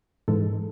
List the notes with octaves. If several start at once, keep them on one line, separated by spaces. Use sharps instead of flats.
G#2 E3 G#3 A4